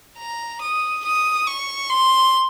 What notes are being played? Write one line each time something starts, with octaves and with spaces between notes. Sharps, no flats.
A#5
D#6
D#6
C#6
C6